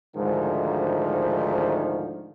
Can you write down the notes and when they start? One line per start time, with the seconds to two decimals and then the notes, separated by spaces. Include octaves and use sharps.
0.16 D2 G#2 D#3 F3